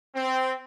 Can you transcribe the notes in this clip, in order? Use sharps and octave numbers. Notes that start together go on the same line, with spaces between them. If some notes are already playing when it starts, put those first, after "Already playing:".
C4